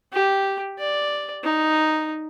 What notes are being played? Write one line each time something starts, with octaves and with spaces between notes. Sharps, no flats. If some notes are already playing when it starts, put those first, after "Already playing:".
G4
D5
D#4